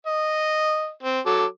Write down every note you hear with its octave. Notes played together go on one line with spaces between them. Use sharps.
D#5
C4
F#3 A4 D6